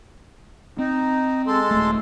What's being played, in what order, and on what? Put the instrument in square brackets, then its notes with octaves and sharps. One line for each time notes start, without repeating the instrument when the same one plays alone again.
[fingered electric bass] C4 [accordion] D#4
[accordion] G#3 A4 C6
[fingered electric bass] D#1 A3